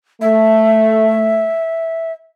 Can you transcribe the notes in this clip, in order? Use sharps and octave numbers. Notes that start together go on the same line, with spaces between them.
A3 E5